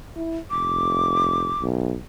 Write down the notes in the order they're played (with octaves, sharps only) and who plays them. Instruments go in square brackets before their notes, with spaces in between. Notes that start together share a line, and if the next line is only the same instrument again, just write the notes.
[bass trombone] E4
[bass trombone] F1 [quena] D6
[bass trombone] B1